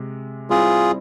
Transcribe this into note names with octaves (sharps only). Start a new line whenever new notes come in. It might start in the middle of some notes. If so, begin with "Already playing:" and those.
Already playing: C3 G#3
G3 C4 E4 F4 G#4